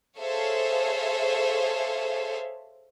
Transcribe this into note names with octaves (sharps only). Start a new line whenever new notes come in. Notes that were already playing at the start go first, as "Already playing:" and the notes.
G#4 A4 C5 C#5 E5 F5